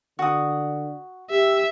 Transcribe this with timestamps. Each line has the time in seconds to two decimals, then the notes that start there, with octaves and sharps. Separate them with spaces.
0.19 D3 F#4 D#6
1.30 G4 E5